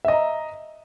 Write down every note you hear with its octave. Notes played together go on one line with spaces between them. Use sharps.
D#5 E5 A#5